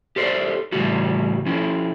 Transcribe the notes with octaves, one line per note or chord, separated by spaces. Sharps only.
G4 A4 C5 D5
A2 C#3 E3 G3 F#4
F3 C#4 E4